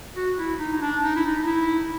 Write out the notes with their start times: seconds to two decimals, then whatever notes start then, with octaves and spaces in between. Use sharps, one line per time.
0.16 F#4
0.39 E4
0.59 D#4
0.72 D#4
0.81 D4
1.03 D#4
1.16 E4
1.25 D#4
1.42 D#4
1.47 E4